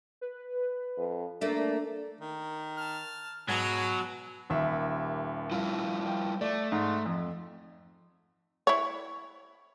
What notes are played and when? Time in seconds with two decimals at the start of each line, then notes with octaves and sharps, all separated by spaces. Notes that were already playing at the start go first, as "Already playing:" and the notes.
0.21 B4
0.97 F2
1.41 A3 A#3 D4 D5
2.21 D#3
2.77 A5 F6
3.48 G#2 B2 F#3 G#4 G#5 G#6
4.50 D#1 D#2 E5
5.51 G3 E4 F4
6.06 G5
6.41 A3 D5
6.72 G#2
7.06 F2
8.67 E4 C#5